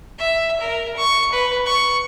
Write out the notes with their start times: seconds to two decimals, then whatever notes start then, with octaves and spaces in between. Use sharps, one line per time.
0.19 E5
0.61 A#4
0.97 C#6
1.33 B4
1.66 C#6